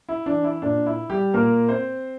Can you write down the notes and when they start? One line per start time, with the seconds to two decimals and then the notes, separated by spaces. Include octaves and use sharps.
0.09 E4
0.26 E3 D4
0.44 E4
0.62 A#2 D4
0.86 E4
1.10 G3 G4
1.34 A#2 A#3 A#4
1.69 C4 C5